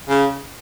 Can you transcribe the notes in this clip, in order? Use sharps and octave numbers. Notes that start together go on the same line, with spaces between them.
C#3